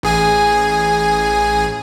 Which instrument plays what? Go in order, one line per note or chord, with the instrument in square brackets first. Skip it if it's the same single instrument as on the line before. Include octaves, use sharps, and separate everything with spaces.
[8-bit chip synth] A1 G#4 G#5